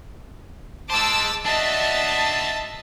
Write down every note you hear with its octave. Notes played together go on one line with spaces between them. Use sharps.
G#3 C5 A5 D6 E6
D4 F#4 D#5 E5 A5